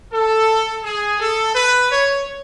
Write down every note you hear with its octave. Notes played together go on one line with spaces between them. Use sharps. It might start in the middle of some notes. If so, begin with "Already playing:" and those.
A4
G#4
A4
B4
C#5